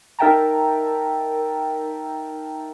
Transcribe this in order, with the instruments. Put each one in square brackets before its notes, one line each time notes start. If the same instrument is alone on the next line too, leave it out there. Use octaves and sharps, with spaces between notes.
[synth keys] D#4 A#4 E5 G5 A5 A#5